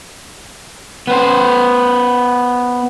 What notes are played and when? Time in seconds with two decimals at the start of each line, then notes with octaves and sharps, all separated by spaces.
1.07 B3 C5